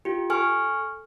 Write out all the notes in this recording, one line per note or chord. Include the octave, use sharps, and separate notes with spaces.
F4 G4
A4 G#5 C#6 F6